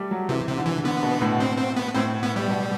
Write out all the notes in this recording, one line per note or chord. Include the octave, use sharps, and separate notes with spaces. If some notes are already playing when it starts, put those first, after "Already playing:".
Already playing: G3 A3
F#3
C3 E3
C3
D3
E3
D3 B3
B2
A2
C4
C4
B3
A2 C4
B3
G3
B2